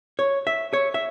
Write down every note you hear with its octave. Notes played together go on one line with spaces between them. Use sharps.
C#5
E5
C#5
E5